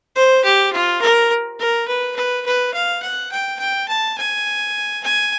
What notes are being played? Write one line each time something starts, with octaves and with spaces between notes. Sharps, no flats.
C5
G4
F4
A#4
A#4
B4
B4
B4
F5
F#5
G5
G5
A5
G#5
G#5